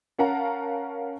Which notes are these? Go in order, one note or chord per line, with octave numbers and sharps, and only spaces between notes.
C#4 A#4 F5 F#5 A5 A#5